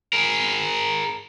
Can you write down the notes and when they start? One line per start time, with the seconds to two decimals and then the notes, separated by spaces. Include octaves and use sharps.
0.13 G#4 A#4